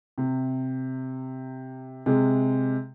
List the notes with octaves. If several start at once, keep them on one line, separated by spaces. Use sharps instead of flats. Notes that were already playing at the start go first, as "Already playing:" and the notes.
C3
C3 G#3